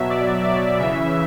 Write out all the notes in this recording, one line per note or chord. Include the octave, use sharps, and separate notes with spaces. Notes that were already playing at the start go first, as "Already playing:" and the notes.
Already playing: B2 F#3 E5
D5
D5
C#3 E3 E5